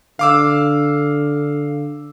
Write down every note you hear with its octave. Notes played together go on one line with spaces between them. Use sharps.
D3 F5 D6 E6